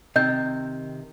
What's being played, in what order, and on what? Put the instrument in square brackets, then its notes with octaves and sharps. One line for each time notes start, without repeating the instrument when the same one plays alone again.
[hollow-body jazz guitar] C3 D#3 [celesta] D#5 G6